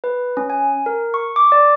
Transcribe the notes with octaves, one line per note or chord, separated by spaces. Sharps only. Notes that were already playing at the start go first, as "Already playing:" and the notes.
B4
C#4
G#5
A#4
C#6
D6
D5